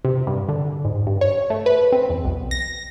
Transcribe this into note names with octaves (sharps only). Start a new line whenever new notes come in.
C3
G2
D3
G#2
G2
C#5
A3
B4
C4
E2
B1
A#6